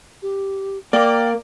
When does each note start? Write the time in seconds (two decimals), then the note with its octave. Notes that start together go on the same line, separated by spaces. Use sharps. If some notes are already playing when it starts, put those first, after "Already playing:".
0.22 G4
0.93 A#3 D5 G5 D6